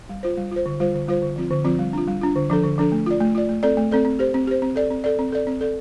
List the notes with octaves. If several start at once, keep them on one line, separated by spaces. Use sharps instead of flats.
G3
F4 C5
G3
F4 C5
D3
G3 F4 C5
D3
G3 F4 C5
D3
F3 C4 F4
D3
F3 C4 F4
G3
D4 F4
G3
D4 F4
D3
F3 D4 A4
D3
F3 D4 A4
A3
F4 D5
A3
F4 D5
A3
C4 A4 D5
A3
C4 A4 D5
C4
G4 C5
C4
G4 C5
C4
A4 D5
C4
A4 D5
C4
A4 D5
C4
A4 D5